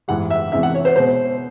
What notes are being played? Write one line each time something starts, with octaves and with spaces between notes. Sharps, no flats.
G#2 E3 G3 F#5
E5
E2 C3 E3 G#3 E5
F#5
C#5
C5
B2 G#3 C5